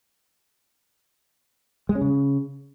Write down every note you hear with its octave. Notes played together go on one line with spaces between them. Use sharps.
G#3
C#4
C#3